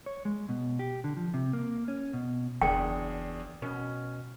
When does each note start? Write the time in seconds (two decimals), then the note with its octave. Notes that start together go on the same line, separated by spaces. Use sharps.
0.06 C#5
0.25 G#3
0.49 B2
0.79 G4
1.04 D3
1.17 F3
1.34 C3
1.53 A#3
1.88 C#4
2.13 B2
2.62 F#1 E2 D4 G#4 G5
3.62 B2 C#4